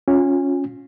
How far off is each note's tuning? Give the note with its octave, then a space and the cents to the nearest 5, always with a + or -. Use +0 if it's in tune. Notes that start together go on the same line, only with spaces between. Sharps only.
C#4 +0 F4 +30 G#5 -30